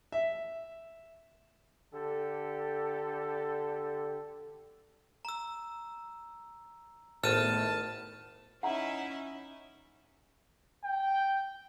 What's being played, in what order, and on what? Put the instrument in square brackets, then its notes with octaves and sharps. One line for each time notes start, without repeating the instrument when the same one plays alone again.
[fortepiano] E5
[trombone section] D3 G4 A4
[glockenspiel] A#5 E6
[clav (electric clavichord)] G#1 [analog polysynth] A2 A3 B3 [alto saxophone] A5 [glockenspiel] F6 D#7
[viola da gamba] C#4 D#4 [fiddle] E4 E5 [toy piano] F#5 A#5
[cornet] G5